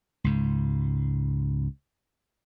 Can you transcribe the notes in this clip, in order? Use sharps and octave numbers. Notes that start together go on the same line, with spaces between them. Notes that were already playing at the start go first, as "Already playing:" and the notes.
C#2 G#2